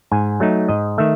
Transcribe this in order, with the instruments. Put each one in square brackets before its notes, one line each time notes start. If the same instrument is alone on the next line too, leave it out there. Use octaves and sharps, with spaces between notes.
[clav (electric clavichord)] G#2 G#5
F#3 A3 D#4
G#2 D#5
D#3 A3 E5